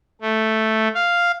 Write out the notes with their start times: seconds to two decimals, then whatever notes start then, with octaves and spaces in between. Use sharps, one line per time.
0.21 A3
0.95 F5